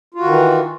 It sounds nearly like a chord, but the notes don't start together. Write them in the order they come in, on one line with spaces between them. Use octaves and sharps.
F4 F#4 D#3 E3